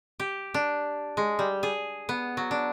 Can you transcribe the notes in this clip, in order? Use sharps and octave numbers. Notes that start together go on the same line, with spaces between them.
G4
D4
G#3
G3
G#4
B3
F#3
D4